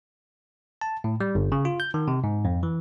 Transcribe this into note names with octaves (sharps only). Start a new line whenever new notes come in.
A5
A2
G3
G1
C#3
F4
G6
D#3
C3
G#2
F2
E3